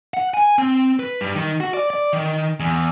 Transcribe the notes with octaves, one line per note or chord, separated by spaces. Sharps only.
F#5
G#5
C4
B4
G2
D#3
F#4
D5
D5
D#3
E2